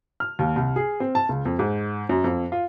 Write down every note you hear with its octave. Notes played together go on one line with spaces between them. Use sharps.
F6
D#2
C2
G#4
C4
A5
C#2
F2
G#2
F#2
F2
F4